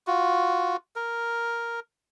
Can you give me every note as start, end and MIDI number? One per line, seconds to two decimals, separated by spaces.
0.07 0.77 65
0.07 0.77 66
0.96 1.80 70